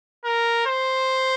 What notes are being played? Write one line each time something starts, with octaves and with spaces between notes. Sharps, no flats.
A#4
C5